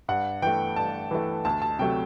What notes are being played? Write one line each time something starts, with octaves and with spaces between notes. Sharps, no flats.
G2 F#5
E3 A3 G5
G2 A5
E3 A3
D2 A5
A5
C3 F#3 A3 G5